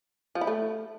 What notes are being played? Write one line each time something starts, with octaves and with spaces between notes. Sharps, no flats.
F3
E4
A3